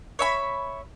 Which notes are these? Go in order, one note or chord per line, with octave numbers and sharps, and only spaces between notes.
C#5 E5 B5